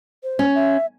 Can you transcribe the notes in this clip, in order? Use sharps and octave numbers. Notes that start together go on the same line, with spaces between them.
C5
C#4
E5